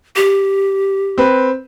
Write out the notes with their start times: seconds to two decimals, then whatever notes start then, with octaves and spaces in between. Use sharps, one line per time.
0.16 G4
1.18 C4 B4